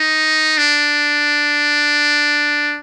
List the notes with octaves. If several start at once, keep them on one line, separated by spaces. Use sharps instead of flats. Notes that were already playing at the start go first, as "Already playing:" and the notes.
Already playing: D#4
D4